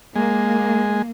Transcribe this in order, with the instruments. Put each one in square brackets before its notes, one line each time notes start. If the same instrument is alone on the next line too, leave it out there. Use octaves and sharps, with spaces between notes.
[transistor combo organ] G#3 [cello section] A#3